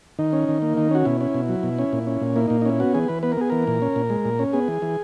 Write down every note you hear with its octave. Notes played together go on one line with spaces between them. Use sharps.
D#3 D#4
C#4
D#3
A#3
D#3
C#4 F#4
B2 E4
C#4
B2
F#3
B2
C#4
A#2
C#4
A#2
A#3 E4
A#2 D#4
D#4
C#4 E4
B3 F#4
E3 G#4
E3 B4
B3 B4
A#4
B3 G#4
E3 A#4
A#2
C#4
A#2
G#3
A#2
C#4
B3 G#4
E3
E3